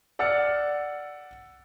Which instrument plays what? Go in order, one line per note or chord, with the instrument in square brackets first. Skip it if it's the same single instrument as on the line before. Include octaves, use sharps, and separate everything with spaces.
[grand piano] D5 F#5 E6 F6 A6 C#7